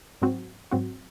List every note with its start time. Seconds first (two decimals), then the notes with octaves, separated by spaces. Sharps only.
0.22 G#2 F#3 C4 F#4
0.71 G#2 F#3 C4 F#4